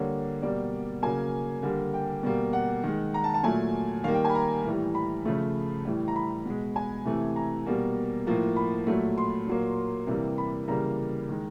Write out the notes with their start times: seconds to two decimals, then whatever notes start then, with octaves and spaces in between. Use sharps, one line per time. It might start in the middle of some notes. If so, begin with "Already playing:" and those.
Already playing: D3 G3 A#3 C#5
0.42 B2 G3 A#3 D5
1.02 C#3 F#3 A#3 G#5
1.63 D3 G3 A#3
1.94 G5
2.23 B2 G3 A#3
2.53 F#5
2.83 D#3 G#3
3.14 A#5
3.24 A5
3.34 A5
3.43 A#2 F#3 A3 G#5
4.04 D#3 G3 A#3 F5
4.14 G5
4.25 G#5
4.30 B5
4.35 A#5
4.64 A2 E3 G3
4.95 B5
5.25 C#3 F3 A3
5.85 A2 E3 G3
6.08 A#5
6.16 B5
6.45 B2 G#3
6.76 G#5
7.05 C3 E3 A3
7.36 A#5
7.66 B2 G3 A#3
8.27 A2 F3 A#3
8.56 B5
8.87 A#2 F#3 A3
9.18 C6
9.47 A#2 F#3 A#3
10.07 C3 E3 G3 A#3
10.38 B5
10.68 C#3 E3 G3 A#3 A#5
11.29 D#3 G#3